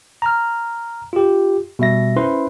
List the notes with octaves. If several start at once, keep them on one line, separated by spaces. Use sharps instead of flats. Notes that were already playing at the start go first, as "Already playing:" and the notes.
A#5 F6
F4 G4
B2 G3 E5 A#6
C#4 E4 B4 C5 C6